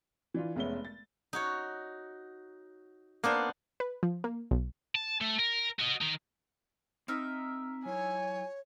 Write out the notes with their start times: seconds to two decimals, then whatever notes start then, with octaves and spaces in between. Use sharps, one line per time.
0.34 E3 D4 F4
0.56 F1 G#3 B3 C#4 E5 G7
0.85 A6
1.33 D#4 F#4 C#5
3.24 A#3 B3 D4 C5
3.80 B4
4.03 F3
4.24 A#3
4.51 B1
4.95 A5
5.21 A3
5.39 A#4
5.79 F#4 D#5
6.01 D#3 D#4
7.08 C4 D#4 A#4 E5
7.86 F#3 E4 F4 C#5 G#5